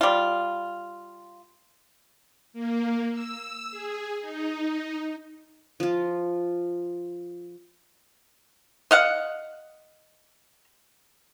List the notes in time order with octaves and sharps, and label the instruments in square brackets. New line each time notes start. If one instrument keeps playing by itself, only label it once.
[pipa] G3 F4
[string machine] A#3
E6
G#4
D#4
[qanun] F3 F4
[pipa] D#5 F5 F#5